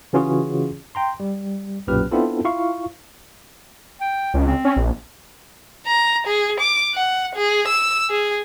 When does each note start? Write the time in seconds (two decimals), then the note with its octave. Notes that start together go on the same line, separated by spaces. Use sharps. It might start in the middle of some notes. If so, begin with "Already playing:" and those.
0.13 C#3 E3 C#4 F4 F#4 G#4
0.95 G5 A#5 C6
1.20 G3
1.87 B1 F#2 A#2 G4 B4 F6
2.11 B3 C4 D4 E4 F4 A4
2.45 E4 F4 F5 C#6
4.01 G5
4.34 C#2
4.46 C4
4.65 C#4
4.76 A#1
5.87 A#5
6.27 G#4
6.60 D6
6.94 F#5
7.35 G#4
7.68 E6
8.10 G#4